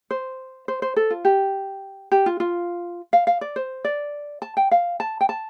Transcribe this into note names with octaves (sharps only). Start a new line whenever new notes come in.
C5
C5
C5
A4
F4
G4
G4
F4
F4
F5
F5
D5
C5
D5
A5
G5
F5
A5
G5
A5